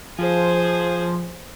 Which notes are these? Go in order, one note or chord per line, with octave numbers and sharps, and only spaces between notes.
F3 G#4 C5